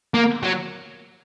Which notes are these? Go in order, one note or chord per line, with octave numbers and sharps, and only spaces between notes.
A#3
F#3